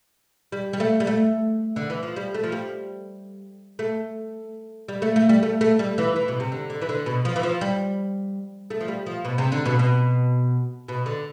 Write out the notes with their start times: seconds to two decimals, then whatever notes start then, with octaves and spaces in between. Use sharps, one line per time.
0.52 G3
0.73 G3
0.80 A3
1.00 G3
1.07 A3
1.76 D3
1.90 E3
2.03 F3
2.16 G3
2.34 A3
2.43 F3
2.52 G3
3.79 A3
4.88 G3
5.02 A3
5.16 A3
5.29 G3
5.43 A3
5.61 A3
5.79 G3
5.98 E3
6.16 E3
6.28 B2
6.40 C3
6.52 D3
6.70 D3
6.81 E3
6.89 D3
7.06 B2
7.25 F3
7.36 E3
7.43 F3
7.61 G3
8.70 A3
8.81 F3
8.88 G3
9.06 F3
9.25 B2
9.38 C3
9.52 D3
9.66 B2
9.79 B2
10.88 B2
11.06 D3